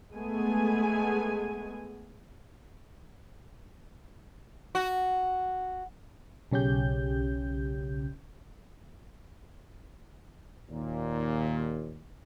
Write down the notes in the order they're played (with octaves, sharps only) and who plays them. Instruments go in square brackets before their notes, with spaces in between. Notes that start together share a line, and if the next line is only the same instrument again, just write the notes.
[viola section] G#3 A3 B3 G#4 G#5
[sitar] F#4
[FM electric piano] B1 C#3 C#4 G4 G6
[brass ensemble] D#2 A#2